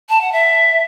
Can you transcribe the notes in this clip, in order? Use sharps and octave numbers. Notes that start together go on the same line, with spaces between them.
A5
F#5
E5